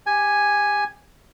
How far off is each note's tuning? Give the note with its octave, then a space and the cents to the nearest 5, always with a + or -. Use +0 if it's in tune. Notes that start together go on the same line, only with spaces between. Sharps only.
G4 +15 G#5 +0